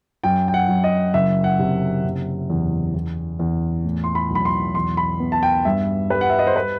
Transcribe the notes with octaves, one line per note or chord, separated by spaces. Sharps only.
F#2 G5
G5
F#5
F#2
D#5
F#1 E5
F#5
C3
F#1
E2
E2
E2
A2
C6
B5
B1
B5
C6
E2 C6
B5
B3
A5
G5
G2 E5
G3 B4
F#5
E5
D#5
C5
B4